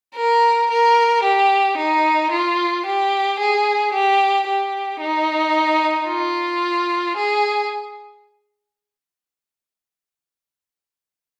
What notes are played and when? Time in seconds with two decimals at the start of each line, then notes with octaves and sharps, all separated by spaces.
0.16 A#4
0.71 A#4
1.24 G4
1.77 D#4
2.31 F4
2.86 G4
3.40 G#4
3.93 G4
4.48 G4
5.01 D#4
6.08 F4
7.17 G#4